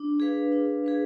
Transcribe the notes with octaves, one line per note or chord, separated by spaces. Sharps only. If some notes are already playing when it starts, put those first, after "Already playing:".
Already playing: D4
G#4 B4 F5
D4
G#4 B4 F5